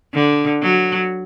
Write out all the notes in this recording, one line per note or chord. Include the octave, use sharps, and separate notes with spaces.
D3
F#3